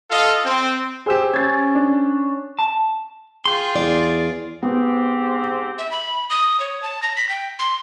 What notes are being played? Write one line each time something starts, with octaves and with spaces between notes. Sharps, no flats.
F4 A4 D#5 F5
C4
G4 G#4 C5 E6 E7
C#4 G#6 A6
D4
A5
F4 G#4 G5 C6
E2 D5
G#2 B3 C4 G4
E5
B5
D#6
C#5
A5
A#6
B6
G5
C6